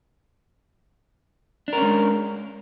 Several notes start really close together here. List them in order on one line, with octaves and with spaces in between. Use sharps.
D4 A#4 C#4 G#3